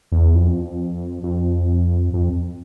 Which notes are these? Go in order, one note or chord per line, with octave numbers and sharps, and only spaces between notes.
E2
F2
F2
F2